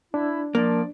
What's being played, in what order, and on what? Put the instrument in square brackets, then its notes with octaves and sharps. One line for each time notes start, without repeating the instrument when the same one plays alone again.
[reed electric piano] D4 [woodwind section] E4
[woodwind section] F3 D5 [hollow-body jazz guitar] A#3